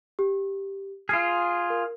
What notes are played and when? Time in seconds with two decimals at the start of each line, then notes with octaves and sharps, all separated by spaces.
0.19 G4
1.09 F4 G#4 F6 C7
1.70 A#4